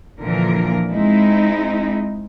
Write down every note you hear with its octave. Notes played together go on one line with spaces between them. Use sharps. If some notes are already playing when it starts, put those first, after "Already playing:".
A#2 D3 E3 F3 A#4
G#3 C4 D#4 E4